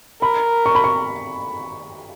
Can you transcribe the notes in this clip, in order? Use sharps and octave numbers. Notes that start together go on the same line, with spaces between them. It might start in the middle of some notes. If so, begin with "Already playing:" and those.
A#4 B5
C#6
B5
C#6